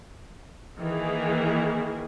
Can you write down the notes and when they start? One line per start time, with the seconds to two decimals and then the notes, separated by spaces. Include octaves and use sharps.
0.79 D#3 E3 A#3 G#4